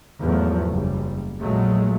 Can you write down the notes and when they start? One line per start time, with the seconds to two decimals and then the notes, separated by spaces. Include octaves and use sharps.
0.21 E2 G#2 F3 F#3 A3
0.68 F#1 G3
1.40 A#1 E2 A#2 F#3 G#3 A3